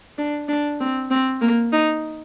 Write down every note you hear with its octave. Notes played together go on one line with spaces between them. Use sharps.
D4
D4
C4
C4
A#3
D#4